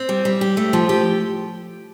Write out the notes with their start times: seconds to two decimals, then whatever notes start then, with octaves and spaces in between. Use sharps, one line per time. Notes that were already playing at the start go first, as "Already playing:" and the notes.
Already playing: C4
0.09 G3
0.25 G3
0.41 G4
0.57 A3
0.73 F3
0.89 G4